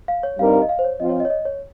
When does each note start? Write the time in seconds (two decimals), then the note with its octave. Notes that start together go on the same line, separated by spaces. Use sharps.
0.08 F5
0.23 C#5
0.38 G2 G3 C4 D#4 A#4 F5
0.53 F5
0.62 D#5
0.69 F5
0.79 C5
0.85 C#5
0.99 F3 C4 F4 D#5
1.09 C#5
1.20 D#5
1.25 C#5
1.30 D#5
1.45 C#5